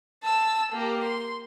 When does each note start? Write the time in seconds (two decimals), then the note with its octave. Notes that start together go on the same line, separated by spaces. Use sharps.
0.23 A5 E6
0.72 A#3 G4
1.04 C6